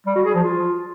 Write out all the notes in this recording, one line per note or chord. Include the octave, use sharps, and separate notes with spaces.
G3
F#4
G#4
F3
F4